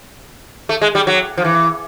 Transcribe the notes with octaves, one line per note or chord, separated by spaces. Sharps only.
A3
G#3
G3
F#3
F3
E3